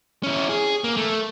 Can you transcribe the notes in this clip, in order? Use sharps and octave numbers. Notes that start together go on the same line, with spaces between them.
C#4 E4
G#4
A#3
A3